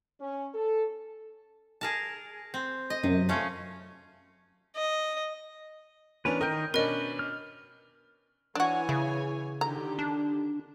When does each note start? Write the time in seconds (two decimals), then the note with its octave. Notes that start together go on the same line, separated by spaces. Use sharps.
0.20 C#4
0.54 A4
1.81 G#4 A#4 A5
2.54 C4
2.90 D#5
3.03 F#2 C3
3.29 A3 C#4 F4
4.76 D#5
6.25 E3 B3 C#4 D4 A#4 B4
6.41 D#3 A#4 D#5 G5 G6
6.74 B2 C#4 D4 A#4 B4 D#5
7.19 F6
8.55 E3 D4 F#4 C#5 G#5
8.89 C#3 E4
9.61 D3 D#3 G4 A#5
9.99 D4